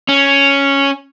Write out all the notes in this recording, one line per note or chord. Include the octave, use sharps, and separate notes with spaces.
C#4